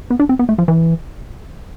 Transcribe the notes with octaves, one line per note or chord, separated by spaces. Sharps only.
B3
D4
C4
B3
A3
F3
E3